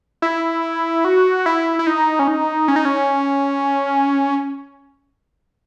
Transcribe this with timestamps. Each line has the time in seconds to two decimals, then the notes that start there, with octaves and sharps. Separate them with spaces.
0.22 E4
1.05 F#4
1.46 E4
1.79 E4
1.87 D#4
2.19 C#4
2.28 D#4
2.68 C#4
2.76 D#4
2.85 C#4